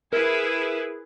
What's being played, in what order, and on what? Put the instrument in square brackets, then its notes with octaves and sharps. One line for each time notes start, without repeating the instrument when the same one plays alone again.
[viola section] E4 G#4 B4 [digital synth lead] A#4